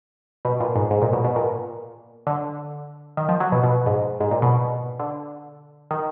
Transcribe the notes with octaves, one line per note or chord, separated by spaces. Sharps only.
B2
A#2
G#2
G#2
A#2
B2
B2
A#2
D3
D#3
F3
F#3
B2
B2
G#2
G#2
A#2
B2
D3
D#3